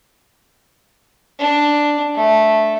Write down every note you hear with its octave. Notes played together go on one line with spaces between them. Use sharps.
D4
A3